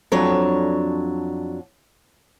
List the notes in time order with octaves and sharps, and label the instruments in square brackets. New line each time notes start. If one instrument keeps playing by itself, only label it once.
[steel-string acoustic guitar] F2 F#3 D4 C#5